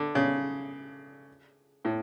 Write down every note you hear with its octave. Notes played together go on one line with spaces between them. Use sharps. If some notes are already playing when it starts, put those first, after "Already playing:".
Already playing: D3
C#3
A2